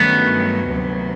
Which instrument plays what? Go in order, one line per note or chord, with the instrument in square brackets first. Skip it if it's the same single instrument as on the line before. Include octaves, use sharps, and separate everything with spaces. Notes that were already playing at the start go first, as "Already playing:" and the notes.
Already playing: [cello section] G2 D#3 F#3 A3 C#4 [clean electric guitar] B3
[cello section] D2 C3 D#3 F#3